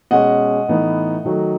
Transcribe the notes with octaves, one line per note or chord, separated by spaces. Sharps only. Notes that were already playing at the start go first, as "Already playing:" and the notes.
B2 G#3 C#4 D#5 F#5
A2 E3 B3 D#4
D#3 F#3 A3 D#4